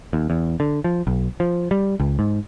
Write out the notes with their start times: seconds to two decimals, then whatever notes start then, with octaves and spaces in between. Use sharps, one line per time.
0.13 D#2
0.30 E2
0.60 D3
0.84 F3
1.07 B1
1.40 F3
1.71 G3
2.00 C#2
2.19 G#2